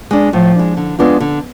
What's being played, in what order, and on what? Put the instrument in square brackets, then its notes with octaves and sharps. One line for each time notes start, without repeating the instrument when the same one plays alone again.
[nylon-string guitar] G#3 D4
[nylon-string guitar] A2 [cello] F3
[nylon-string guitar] G#3 D4
D3
G#3 B3 D4 F4
D3